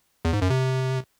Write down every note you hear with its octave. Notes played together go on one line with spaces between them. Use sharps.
E2
G#2
F#2
C3